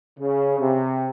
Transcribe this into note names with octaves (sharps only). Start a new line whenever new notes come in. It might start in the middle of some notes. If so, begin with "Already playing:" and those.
C#3
C3